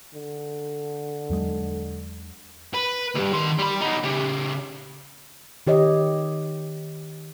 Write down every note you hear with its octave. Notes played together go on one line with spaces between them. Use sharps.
D3
E2 F#3 G#3
B4
D2 G2
D#3 C6
G3 B5
B3 D#4
C#3 G4
D#3 G4 C#5 D#5